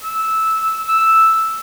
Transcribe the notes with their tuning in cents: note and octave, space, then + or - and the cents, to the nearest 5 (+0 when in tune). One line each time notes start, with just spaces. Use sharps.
E6 -10
E6 +0